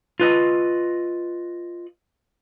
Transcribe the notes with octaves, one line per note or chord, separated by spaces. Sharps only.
F4 B4 D#5